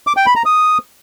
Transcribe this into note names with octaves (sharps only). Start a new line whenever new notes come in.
D6
G5
B5
A#5
D#6